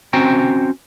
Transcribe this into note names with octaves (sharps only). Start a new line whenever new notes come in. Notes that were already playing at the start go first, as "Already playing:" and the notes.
C4 C#4 F#4 C5 G5 A#5